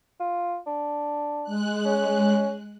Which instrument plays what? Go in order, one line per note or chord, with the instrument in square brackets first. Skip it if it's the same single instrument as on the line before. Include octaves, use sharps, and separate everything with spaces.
[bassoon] F4
D4
[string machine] G#3 F#6
[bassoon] C#4